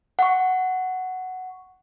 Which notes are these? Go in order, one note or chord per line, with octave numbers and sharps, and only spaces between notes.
F#5 C#6